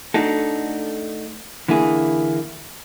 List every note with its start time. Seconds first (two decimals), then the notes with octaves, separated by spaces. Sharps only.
0.14 A3 D4 D#4 F#4 A4
1.68 D3 E3 A#3 E4 G#4